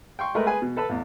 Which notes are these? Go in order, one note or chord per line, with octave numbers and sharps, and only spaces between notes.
G5 C6 C#6
G#3 A3 A#4 B4
G#4 B4 G#5
B2
A4 B4 A5 B5
A1 E2